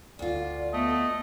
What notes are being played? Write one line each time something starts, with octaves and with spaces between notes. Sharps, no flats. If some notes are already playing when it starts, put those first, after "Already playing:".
D2 F4 D5
A3 B3 D#5